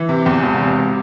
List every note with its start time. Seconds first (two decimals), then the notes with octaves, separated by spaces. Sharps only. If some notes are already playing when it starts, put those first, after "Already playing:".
Already playing: E3
0.09 C3
0.26 E2
0.43 E1
0.61 C3